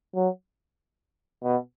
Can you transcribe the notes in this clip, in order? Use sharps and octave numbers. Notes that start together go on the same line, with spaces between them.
F#3
B2